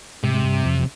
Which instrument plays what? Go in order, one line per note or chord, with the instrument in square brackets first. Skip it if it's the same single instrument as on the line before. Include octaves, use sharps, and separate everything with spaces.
[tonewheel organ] G#2 G#3 [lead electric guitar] C3
[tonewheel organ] G#3
G2 G3
F2 F3
F3